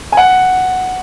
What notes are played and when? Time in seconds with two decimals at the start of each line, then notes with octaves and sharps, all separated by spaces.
0.12 G#5
0.17 F#5